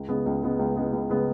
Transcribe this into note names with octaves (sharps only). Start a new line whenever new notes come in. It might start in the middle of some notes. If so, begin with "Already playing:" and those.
Already playing: C#2
C#3 G#3 B3
C#2
C#3 G#3 B3
C#2
C#3 G#3 B3
C#2
C#3 G#3 B3